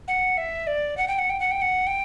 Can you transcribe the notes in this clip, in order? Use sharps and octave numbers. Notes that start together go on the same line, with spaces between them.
F#5
E5
D5
F#5
G5
F#5
G5
F#5
G5
F#5
G5